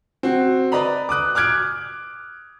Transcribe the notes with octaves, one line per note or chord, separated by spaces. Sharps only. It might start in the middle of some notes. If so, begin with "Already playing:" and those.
C4 F#4
B4 D5 D#5 A#5 B5
D6 D#6 F#6
D6 F6 F#6 G#6 D7